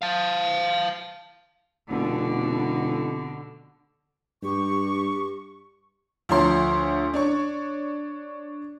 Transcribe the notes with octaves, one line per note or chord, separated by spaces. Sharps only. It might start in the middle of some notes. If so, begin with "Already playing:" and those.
F5 A5
F1 B2 D3
G2 G4 C#6
D2 F3 C#5 C6
D4 C#5 C#6